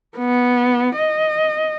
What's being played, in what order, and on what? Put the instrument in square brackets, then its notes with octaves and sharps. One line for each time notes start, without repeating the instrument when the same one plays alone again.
[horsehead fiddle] B3
D#5